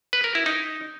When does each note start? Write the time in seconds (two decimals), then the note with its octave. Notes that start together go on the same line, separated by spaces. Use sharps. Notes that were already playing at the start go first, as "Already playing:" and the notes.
0.13 B4
0.24 A#4
0.35 E4
0.46 D#4